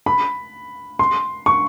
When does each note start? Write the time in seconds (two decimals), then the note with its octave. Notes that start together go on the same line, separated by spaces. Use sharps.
0.06 B5
0.99 C6
1.46 C#6